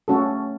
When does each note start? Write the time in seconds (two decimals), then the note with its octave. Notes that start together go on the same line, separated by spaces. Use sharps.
0.08 A3 C#4 F#4 A4